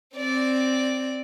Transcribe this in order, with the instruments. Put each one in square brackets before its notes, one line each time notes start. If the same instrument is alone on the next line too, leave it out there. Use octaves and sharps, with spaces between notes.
[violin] C4 D5